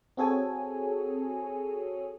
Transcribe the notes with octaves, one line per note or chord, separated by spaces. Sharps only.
C4 F#4 G#4 A4 C#5 G#5